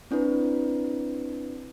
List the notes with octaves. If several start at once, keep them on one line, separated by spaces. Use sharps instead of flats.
C4 D4 E4 B4